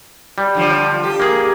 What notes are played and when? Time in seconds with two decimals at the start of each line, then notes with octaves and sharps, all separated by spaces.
0.38 G3
0.54 D3 F3
1.03 G4
1.20 A#3 G#4